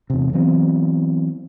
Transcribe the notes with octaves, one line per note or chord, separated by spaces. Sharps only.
E2 C3
E3 F#3 B3 C4